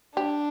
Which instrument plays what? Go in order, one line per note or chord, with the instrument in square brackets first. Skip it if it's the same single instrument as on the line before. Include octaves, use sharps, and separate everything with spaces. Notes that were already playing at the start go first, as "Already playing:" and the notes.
[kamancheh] D4 [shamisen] G4